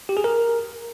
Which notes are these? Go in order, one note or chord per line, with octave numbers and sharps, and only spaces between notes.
G4
G#4
A#4